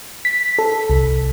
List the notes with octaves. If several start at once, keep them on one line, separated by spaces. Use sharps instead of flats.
B6
A4
C2